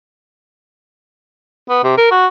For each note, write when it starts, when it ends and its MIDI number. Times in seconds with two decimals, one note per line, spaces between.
1.70 1.79 59
1.84 1.95 48
1.97 2.08 70
2.11 2.27 66